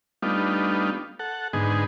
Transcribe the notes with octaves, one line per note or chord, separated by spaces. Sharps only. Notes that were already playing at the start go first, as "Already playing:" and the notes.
G3 A3 B3 D4 D#4 F4
A4 F#5
G#2 D3 B3 D#4 G#4